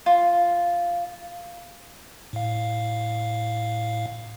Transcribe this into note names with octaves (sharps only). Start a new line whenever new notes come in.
F4
A2 F5